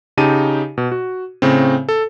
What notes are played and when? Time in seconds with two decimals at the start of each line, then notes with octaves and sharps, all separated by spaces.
0.17 C#3 D#4 G4 A5 D#7
0.78 B2
0.92 F#4
1.42 A2 C#3 C4
1.89 A4